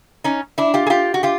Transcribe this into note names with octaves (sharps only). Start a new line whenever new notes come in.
C#4 D#4
D4 E4
F4 G4
G#4
F4 G4
F#4
F4 G4